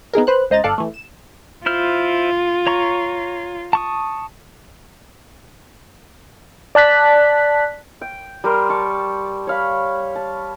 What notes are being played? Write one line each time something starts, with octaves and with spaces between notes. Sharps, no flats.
B3 D#4 G#4 A#4
B4 C5 F#6
C#2 C5 D#5 A#5 A6
G1 A4 D5 F5 F#6
E3 A3
E7
E4 F4 C5 F6
C#5 A#5 C#6
A5 C#6 D#6
D5 A5 F#6 B6
G5
G3 A#4 C6
A5 C#6
C#5 F5 B5
A5